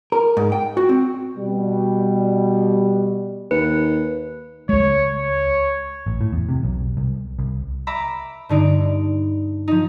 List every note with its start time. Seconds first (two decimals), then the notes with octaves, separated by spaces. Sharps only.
0.12 A#4
0.37 G#2
0.52 G5
0.77 F#4
0.89 C4
1.37 B2 G3
3.51 D#2 B4
4.69 C#2 G#3 C#5
5.16 C#5
6.06 A1
6.21 A2
6.33 E2
6.49 C3
6.63 B1
6.97 C2
7.39 C2
7.87 E5 A#5 B5 D6
8.49 G2 D3 D#4 D7
9.68 F3 D#4